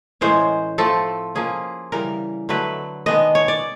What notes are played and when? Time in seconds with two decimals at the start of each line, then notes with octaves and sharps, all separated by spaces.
0.21 A2 E3 G#3 C#4 C5
0.78 F3 A3 C4 A4
1.35 F3 A#3 C#4 G#4
1.92 C#3 E3 G3 A#4
2.49 D3 F#3 A3 B4
3.06 D#3 G#3 B3 D4 D#5
3.35 C#5
3.48 D5